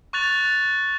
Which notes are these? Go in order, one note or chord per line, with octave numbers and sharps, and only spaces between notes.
C#6 F#6 A6 F7